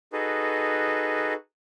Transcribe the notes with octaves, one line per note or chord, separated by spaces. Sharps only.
D#4 F#4 G#4 A4 B4